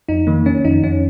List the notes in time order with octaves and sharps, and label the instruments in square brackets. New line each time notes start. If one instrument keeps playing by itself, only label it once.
[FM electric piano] F2 D#4
D#3 A#3
D#3 C#4
F2 D#4
F2 C#4